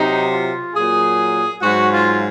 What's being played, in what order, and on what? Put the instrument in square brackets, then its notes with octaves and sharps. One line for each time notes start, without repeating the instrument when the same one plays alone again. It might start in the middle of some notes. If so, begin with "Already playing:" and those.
Already playing: [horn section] C3 F#3 D#4
F4
A#2 F#3 G#4
G#2 F#3 F#4
F4